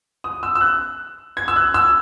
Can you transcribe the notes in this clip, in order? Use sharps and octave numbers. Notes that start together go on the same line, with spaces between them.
D#6
E6
E6
F#6
G#6
E6
F#6
E6